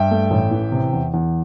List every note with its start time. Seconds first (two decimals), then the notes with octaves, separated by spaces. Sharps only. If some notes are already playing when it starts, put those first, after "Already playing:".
Already playing: G2 E5 G5
0.11 A3
0.31 A1
0.51 E3
0.72 C3
0.93 E2
1.14 E2